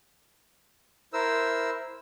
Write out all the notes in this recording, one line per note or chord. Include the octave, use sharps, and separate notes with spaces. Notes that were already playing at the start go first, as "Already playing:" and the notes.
E4 A#4 C5 E6